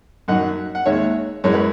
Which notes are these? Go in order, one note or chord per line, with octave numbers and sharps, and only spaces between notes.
F#2 D#3 F#3 D#5 F#5
F#5
D#2 D#3 G#3 C#5 E5
F#2 E3 G#3 C#5
B4